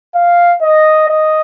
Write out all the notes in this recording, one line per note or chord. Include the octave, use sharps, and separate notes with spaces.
F5
D#5
D#5